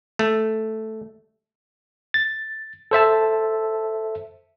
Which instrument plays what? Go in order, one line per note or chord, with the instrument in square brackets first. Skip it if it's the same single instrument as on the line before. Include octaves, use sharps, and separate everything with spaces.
[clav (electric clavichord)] A3
[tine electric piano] A6
A4 C5 E5 A5